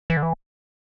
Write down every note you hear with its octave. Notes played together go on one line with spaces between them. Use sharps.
E3
D3
E3